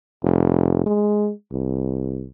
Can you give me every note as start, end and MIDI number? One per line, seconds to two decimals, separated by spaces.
0.23 0.81 29
0.86 1.31 56
1.52 2.27 36